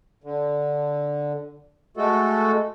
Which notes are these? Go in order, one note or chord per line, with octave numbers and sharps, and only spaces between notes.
D3
G#3 A3 F#4 A4